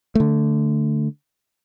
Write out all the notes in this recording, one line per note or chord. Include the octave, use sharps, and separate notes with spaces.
D3 A3